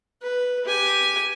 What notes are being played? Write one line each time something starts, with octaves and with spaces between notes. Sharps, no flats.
B4
G4 G#5